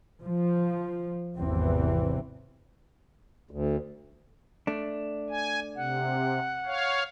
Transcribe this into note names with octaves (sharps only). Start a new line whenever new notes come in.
F3
G#1 E2 C3 E3 C4
D2
A3 D4
G#5
C3 F#5
C#5 F5